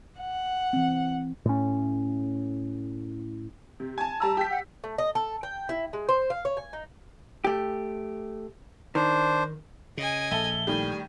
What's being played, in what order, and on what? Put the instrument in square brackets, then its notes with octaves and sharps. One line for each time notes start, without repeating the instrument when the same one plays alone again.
[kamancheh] F#5
[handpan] E3 C4
[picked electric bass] A2 C#4
[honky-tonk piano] C3
G#5 A5
[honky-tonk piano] G3 A#5 E6 [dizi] A5
[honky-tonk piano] G4 B6
[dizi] F#5
[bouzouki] A3
D#5
A4
G5
E4
G#3
C5
F5
C#5
G#5
D#4
[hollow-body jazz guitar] A3 G4
[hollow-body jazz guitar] D#3 [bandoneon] D4 C5
[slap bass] C#3 [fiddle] D#5 G#5
[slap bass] A#1 [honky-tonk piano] A4 E5 [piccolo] G7
[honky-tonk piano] A2 D#3 G3 [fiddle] G#5